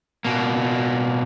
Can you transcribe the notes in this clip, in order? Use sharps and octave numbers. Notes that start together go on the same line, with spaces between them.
B2 A#3